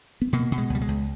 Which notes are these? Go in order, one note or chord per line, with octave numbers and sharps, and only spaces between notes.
B3
B2 A#3
B2
G#3
C#2 G3
G#3
C#2